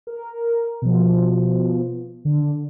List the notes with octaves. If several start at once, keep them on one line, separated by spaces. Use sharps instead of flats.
A#4
B2 F3
D3